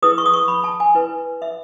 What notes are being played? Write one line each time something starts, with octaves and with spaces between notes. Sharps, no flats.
E4 G#4 B4 D#6
C#6
D#6
C#6
B5
A5
G#5
E4 B4
E5